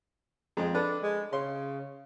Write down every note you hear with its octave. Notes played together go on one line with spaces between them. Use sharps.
F2 G#3 C4
D4 A4 B4
G#3
C#3 C6